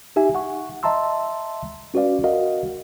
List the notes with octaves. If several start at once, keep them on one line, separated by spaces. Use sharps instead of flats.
D#4 G4 E5 G#5
F#5 C#6
D#5 E5 A5 A#5 C6 E6
C#4 F#4 B4 D5 F5
F#4 A#4 D#5 F5 F#5